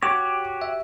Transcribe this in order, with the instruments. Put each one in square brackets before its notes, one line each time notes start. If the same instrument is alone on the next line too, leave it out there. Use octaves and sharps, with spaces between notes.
[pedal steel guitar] F#4 G4 C#5 [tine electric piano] D6
[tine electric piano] E5